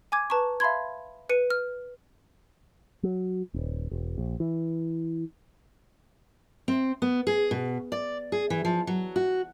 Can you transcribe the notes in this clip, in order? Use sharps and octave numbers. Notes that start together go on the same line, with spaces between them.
G#5 D6 G#6
B4 A5 A#5 C#6
E5 F5 A5 B5 C6 G#6
B4 C#7 D#7
F6
F#3
D#1
E1
A#1
E3
C4
B3
G#4
B2
D5
G#4
E3
F3
F#3
F#4